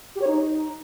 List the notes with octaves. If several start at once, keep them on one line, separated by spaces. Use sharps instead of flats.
G4
C#5
D#4